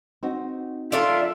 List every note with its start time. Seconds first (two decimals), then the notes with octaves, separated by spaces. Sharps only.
0.23 C4 D#4 F#4
0.92 D4 F4 A4 A#4 E5